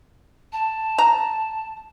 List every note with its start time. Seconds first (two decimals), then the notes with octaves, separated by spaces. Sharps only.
0.52 A5
0.98 A#5